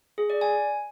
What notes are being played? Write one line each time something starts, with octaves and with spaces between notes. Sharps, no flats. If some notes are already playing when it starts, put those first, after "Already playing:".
G#4
D5
G#5